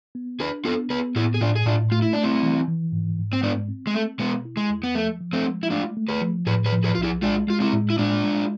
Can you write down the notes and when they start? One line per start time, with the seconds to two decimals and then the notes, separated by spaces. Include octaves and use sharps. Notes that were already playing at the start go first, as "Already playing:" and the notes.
0.15 B3
0.40 D4 G#4 B4
0.65 B3 F4 A4
0.90 B3 G#4 B4
1.16 A2 E4 G#4
1.34 G#4
1.41 A2 D4 F4
1.56 G#4
1.66 A2 D4 F4
1.92 A3 F4
2.02 E4
2.13 A3 D4
2.24 C4 E4
2.43 E3
2.68 E3
2.92 G#2
3.18 G#2
3.33 C4
3.43 G#3 B3 D4
3.68 C4
3.87 G#3
3.94 A3 C4
4.19 B2 G#3 B3
4.45 E4
4.57 G#3
4.70 E2
4.83 B3
4.95 F3 A3
5.21 F3
5.33 A3 C4
5.46 G#3
5.63 E4
5.70 A3 D4 F4
5.97 A3
6.09 G#4 B4
6.22 F3
6.47 A2 G#4 B4
6.66 G#4 B4
6.72 F3
6.84 G#4 B4
6.95 B1 F4
7.03 E4 G#4
7.22 G#3 D4 F4
7.48 G#3 F4
7.60 C4 E4
7.73 A2
7.90 E4
7.98 G#3 D4 F4
8.24 G#3